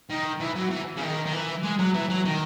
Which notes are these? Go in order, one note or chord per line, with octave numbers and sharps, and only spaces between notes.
D#3
E3
F#3
E3
C#3
D#3
D#3
E3
G#3
F#3
E3
F#3
D#3